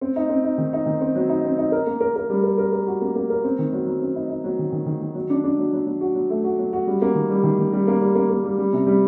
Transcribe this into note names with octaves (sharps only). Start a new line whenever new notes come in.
C4
D#4
C4
D#4
D#3
D#4
D#3
C4
F#3
D#4
C4
D#4
A#4
A#3
A#4
A#4
G3
A#4
A#4
A#4
F#4
A#3
A#3
A#4
C4
D#3
F#3
F#3
C4
D#4
D#4
F#3
D#3
D#3
D#3
D#3
F#3
D4
D4
F#3
F#3
F#3
F#4
F#3
A3
F#4
F#3
F#4
G3
A#3
D#3
G3
D#3
D#3
G3
A#3
G3
A#3
A#3
G3
G3
C3
G3